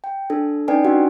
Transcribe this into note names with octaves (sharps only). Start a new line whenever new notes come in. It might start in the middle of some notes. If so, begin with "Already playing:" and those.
G5
D4 A4
C#4 D#4 B4 D5 G5 G#5
D4 F#4 G4 F#5